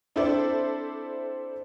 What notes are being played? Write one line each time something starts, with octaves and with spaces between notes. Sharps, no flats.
C4 D4 E4 A4 C5 D5